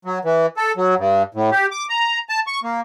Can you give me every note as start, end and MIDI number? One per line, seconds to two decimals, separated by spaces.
0.05 0.18 54
0.24 0.46 52
0.57 0.72 69
0.77 0.95 54
0.98 1.23 43
1.34 1.50 45
1.52 1.66 67
1.71 1.85 86
1.89 2.19 82
2.29 2.40 81
2.47 2.60 85
2.63 2.81 58